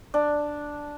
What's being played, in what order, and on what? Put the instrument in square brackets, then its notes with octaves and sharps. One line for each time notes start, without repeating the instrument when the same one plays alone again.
[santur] D4